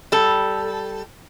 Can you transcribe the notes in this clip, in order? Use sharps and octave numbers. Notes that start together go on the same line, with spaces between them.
G3 A4